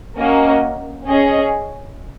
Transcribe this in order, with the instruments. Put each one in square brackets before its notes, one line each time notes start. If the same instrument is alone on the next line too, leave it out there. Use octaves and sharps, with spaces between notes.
[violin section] A#3 C#4 F#4 D#5
C#4 G#4 D#5